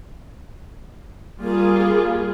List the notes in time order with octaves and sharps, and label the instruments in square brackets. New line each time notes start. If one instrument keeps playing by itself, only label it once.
[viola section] G3 F4 G#4 [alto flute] A#3